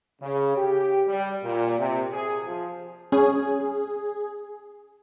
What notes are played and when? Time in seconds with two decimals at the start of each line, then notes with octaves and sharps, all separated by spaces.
0.20 C#3
0.56 G4
1.07 G3
1.43 A#2
1.78 C3
2.11 G#4
2.45 F3
3.12 C#4 G#4